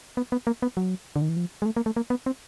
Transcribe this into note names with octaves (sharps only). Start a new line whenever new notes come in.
B3
B3
A#3
B3
F#3
D3
D#3
E3
F3
G#3
A3
A#3
A3
A#3
B3
C4